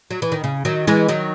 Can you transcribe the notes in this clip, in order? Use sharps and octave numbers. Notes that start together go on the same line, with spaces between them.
F#3
E3
D#3
C#3
D#3 F#3
E3 G#3
D#3 F#3